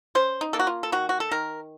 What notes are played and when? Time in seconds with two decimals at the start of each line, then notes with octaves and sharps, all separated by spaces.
0.15 C#4 C5
0.41 D#4
0.53 A#3 A4
0.59 F#4
0.67 F4
0.83 A4
0.92 D#3 F#4
1.09 F#4
1.20 A4
1.32 D#3 A#4